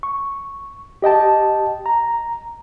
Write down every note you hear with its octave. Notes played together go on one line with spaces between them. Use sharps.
C#6
G4 D#5 G5 A5
A#5